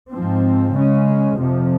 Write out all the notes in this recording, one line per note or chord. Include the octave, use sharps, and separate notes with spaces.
G#2 F3 C4
C#3 G#3 C#4
F2 C3 F3